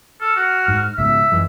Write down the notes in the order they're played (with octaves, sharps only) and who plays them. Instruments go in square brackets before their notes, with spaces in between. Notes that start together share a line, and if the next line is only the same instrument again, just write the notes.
[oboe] A4 [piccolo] F6
[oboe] F#4
[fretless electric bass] G#2
[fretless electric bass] C#2 G#2 B2 [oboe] E5
[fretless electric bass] F#2 E3 G#3